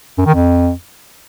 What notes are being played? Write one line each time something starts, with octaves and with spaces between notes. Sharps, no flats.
F#2
D#3
F2